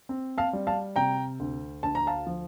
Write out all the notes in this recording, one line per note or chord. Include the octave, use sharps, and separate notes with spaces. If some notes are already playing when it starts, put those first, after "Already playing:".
C4
F5 A5
G3
F5 A5
C3 G5 A#5
D2
D2 A5
A#5
F5 A5
F3